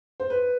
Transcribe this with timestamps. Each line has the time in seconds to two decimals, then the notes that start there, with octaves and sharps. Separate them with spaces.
0.20 C5
0.30 B4